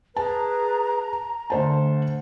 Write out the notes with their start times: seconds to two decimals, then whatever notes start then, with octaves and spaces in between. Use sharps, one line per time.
0.17 G#4 B4 A5 A#5
1.50 D2 C5 F#5 A5